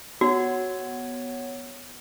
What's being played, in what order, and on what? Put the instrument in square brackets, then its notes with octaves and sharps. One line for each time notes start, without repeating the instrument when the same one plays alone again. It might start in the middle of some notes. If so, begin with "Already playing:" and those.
[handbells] B3 C#5 [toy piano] F#4